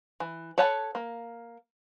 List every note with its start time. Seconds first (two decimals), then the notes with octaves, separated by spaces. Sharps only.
0.20 E3
0.58 A4 B4 C#5 F#5 A5
0.95 A#3